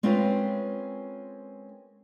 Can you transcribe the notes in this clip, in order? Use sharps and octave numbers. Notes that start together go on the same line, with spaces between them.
G#3 C4 C#4 F4 A#4 B4